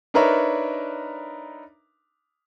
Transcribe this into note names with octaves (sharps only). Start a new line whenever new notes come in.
D4 D#4 A#4 B4 C#5 E5